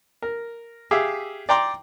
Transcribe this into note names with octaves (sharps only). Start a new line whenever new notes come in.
A#4
G4 G#4 E5 F5
D5 G5 A#5 C6 D6